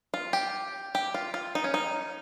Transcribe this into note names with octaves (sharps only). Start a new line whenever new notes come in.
F4
G4
G4
F4
F4
D#4
C#4
D#4